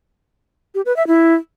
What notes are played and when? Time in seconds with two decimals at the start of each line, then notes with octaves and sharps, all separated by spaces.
0.75 G4
0.86 B4
0.96 E5
1.07 E4